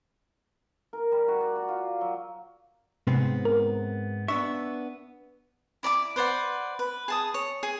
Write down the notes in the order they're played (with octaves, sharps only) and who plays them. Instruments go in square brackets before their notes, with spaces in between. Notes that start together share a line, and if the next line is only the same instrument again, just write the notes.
[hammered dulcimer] A#4
G3
F#4
D5
F#4
F4
F#3
[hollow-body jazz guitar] G#2 B3 C4 [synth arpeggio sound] C3
[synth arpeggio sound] A#4
[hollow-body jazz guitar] B3 D4 E5 [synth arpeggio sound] C#6
[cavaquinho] E4 D5 A5 D6
B4 C5 D5 F#5
B4
G#4 A5 D#6
C#5
G#4